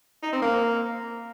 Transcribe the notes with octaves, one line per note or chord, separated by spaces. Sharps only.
D#4
C4
A#3